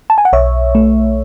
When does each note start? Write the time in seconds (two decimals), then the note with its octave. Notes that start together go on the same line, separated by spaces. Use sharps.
0.10 A5
0.18 G#5
0.25 F#5
0.33 B1 C#5 E5
0.75 A3